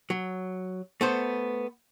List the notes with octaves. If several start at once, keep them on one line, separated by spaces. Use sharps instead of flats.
F#3
A3 B3 C5